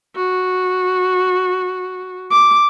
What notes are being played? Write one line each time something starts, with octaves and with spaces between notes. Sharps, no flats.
F#4
D6